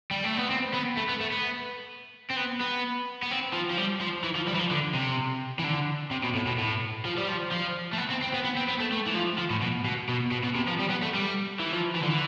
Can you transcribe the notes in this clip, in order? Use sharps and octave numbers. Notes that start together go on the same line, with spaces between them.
G3
A3
B3
C4
B3
A3
B3
A3
B3
C4
B3
B3
B3
C4
F3
F3
G3
F3
E3
F3
G3
E3
F3
D3
C3
E3
D3
C3
B2
A2
B2
A2
F3
G3
F3
F3
A3
B3
C4
C4
B3
B3
C4
B3
A3
A3
E3
F3
F3
A2
B2
B2
B2
B2
B2
C3
F3
G3
B3
A3
G3
E3
F3
E3
D3
E3